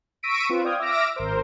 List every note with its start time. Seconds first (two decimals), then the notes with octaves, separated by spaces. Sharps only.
0.23 C#6 E6 A#6 B6 D7 D#7
0.49 C4 F4 B4
0.64 D5 F5 G5 D#6 F6 G#6
0.79 E5 D6 E6 F6 A#6 D7
1.16 G#1 A#4 C5